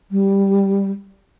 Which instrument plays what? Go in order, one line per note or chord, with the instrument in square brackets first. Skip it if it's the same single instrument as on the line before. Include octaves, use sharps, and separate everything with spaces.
[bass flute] G3